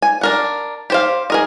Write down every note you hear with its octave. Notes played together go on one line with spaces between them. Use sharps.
G#5
D4 A#4 F#5
G4 C5 F5
G#4 A#4 D#5